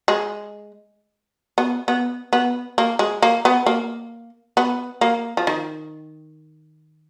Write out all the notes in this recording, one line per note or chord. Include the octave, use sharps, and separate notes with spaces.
G#3
B3
B3
B3
A#3
G#3
A#3
B3
A#3
B3
A#3
F3
D#3